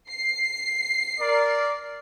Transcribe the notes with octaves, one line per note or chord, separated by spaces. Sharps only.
C7
A#4 D5